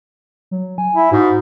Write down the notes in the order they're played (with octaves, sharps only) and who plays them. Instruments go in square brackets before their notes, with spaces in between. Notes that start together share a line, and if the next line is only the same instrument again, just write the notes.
[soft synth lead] F#3
G#5
[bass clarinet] E4
[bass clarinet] G#2 [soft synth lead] F#4